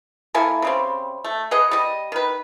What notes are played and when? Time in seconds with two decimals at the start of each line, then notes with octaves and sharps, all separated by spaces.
0.34 A#3 E4 A4 G#5
0.62 C#3 G3 C4
1.24 A3
1.51 G#4 B4 D#5 F#5
1.71 G3 D#5
2.12 D#3 B4